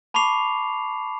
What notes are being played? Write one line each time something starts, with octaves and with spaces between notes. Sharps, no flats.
A5 B5 C#6 D6 C7 F7